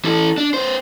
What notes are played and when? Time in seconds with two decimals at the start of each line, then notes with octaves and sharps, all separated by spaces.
0.05 E3 A4
0.38 D4
0.54 B3 C5